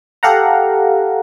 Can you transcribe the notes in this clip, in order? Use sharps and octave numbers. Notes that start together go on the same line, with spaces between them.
G4 A4 F5 F#5 A#5